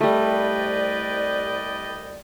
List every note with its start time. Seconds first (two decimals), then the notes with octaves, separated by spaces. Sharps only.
0.01 C2 G3 A3 B4 D5 D#5 G5